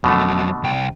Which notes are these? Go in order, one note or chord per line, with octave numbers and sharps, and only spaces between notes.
F2 B2 D3 F#3 A3
C2 G5